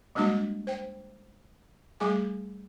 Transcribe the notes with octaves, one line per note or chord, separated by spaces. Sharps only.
G3 G#3 A#3 D4 F#4
C5 G5
G3 A3 G#4 G#5